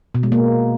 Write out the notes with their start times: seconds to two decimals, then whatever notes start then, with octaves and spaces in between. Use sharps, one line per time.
0.15 B2
0.23 G#3
0.32 A#3